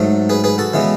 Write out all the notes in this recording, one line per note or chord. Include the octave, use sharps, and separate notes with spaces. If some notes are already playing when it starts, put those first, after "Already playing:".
Already playing: G#2 F#3 A3
G#4 B4
G#4 B4
F#4 A4
C#3 E3 G#3 B3